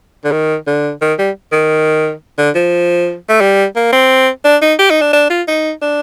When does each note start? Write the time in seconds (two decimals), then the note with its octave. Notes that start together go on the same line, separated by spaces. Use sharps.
0.24 D3
0.32 D#3
0.67 D3
1.01 D#3
1.18 G3
1.52 D#3
2.38 D3
2.55 F3
3.29 A3
3.41 G3
3.76 A#3
3.92 C4
4.44 D4
4.62 D#4
4.79 G4
4.90 D#4
5.01 D4
5.13 D4
5.30 F4
5.47 D#4
5.82 D4